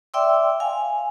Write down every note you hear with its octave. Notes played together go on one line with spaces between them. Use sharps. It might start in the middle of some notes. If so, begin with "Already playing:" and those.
D5 E5 G5 C6 D6 E6
F5 G#5